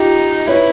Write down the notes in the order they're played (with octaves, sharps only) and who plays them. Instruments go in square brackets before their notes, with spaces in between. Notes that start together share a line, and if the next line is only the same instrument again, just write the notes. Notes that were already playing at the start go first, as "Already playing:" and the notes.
Already playing: [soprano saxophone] D#4 [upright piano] F4 G4
[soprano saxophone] E4 [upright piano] B4 C#5